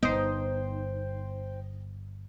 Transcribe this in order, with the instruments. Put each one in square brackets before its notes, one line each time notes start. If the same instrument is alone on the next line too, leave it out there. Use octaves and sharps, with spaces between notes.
[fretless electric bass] G1 E2 B3 [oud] D#4 [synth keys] C5 G5